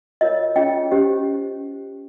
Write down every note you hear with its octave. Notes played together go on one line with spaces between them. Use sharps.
F4 A#4 C#5 D#5
C#4 F4 G#4 D#5 G5
C#4 G4 C5